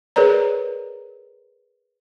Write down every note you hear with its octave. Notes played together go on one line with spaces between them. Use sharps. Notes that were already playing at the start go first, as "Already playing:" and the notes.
G#4 A#4 B4 C#5 D5 A#5